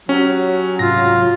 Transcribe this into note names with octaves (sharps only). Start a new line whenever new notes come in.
F#3 C#4 G4
C2 G#2 F4 A#6